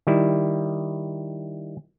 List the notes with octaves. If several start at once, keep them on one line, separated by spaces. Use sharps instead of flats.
D#3 G3 E4